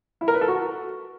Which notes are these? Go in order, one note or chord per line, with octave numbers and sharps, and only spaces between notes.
E4
A#4
B4
A4
F#4